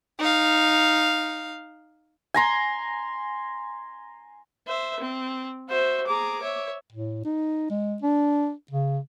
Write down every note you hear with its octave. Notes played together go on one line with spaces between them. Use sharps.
D#4 F5
G#5 A#5 C6
C5 E5
C4
F#4 C5 E5
G#4 A#5 D6
C#5 E5
A2
D#4
G#3
D4
C#3